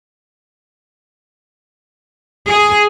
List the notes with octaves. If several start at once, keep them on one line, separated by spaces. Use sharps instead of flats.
G#4